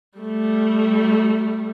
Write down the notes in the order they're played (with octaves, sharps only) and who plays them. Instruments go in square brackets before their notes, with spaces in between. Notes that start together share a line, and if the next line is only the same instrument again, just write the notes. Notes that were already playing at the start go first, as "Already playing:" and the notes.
[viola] G3 A3